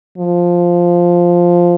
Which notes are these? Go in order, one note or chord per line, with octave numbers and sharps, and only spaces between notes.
F3